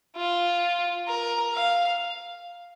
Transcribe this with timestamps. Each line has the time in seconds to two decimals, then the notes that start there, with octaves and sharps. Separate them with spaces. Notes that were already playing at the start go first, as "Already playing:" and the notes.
0.16 F4
1.08 A#4
1.54 F5